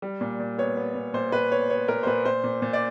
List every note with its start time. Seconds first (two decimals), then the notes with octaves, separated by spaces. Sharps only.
0.02 G3
0.21 A#2
0.40 A#2
0.58 B3 C#5
0.77 B3
0.95 A#2
1.14 A#2 C5
1.32 A#2 B4
1.51 B3 C#5
1.69 B3 C#5
1.88 A#2 A#4
2.03 C5
2.06 A#2 B4
2.25 A#2 C5
2.44 A#2
2.62 A#2
2.73 D5